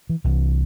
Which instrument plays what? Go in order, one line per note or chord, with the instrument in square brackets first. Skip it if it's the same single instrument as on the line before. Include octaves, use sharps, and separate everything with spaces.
[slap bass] E3
C2 C3 E3